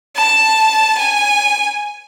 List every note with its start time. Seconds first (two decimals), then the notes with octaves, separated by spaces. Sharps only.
0.16 A5
0.98 G#5